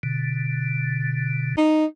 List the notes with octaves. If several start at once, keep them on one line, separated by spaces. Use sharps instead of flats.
B2 D3
D#4